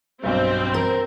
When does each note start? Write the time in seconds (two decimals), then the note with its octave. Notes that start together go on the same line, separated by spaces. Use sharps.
0.23 B1 G2 C4
0.74 A#4